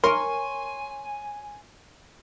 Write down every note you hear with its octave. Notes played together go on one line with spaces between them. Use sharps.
A#4 C#5 G#5 C6